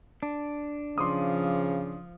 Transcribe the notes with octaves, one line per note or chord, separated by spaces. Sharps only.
D4
C#3 F3 C6 D6 D#6